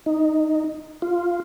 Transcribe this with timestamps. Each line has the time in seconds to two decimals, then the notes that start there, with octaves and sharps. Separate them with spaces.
0.06 D#4
1.02 F4